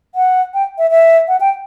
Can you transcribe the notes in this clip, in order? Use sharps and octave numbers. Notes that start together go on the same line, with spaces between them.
F#5
G5
E5
E5
F#5
G5